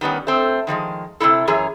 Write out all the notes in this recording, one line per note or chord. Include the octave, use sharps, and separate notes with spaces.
D#3 G3 B3 C#4
A3 C4
D#3 F3 G3 G#3
C3 G#3 A3 E4 A4
F#2 E3 G#4 C#5 A#5